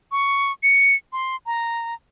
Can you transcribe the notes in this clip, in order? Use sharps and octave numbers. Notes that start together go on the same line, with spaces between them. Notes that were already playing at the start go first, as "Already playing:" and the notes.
C#6
C#7
C6
A#5